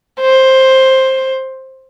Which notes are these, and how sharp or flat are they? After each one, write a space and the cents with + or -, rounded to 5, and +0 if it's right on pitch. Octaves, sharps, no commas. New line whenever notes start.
C5 +10